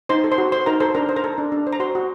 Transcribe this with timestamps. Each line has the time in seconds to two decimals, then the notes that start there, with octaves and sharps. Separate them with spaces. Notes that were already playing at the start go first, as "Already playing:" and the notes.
0.09 D#4 C5 C6
0.24 A4
0.32 C5 C6
0.38 F#4
0.52 C5 C6
0.66 D#4 A#4 A#5
0.80 A4 C5 C6
0.95 D4 A#4 A#5
1.09 C5
1.16 A#4 A#5
1.24 A4
1.38 D4
1.52 D4
1.67 C5
1.73 A#5
1.80 F#4 C5 C6
1.95 F#4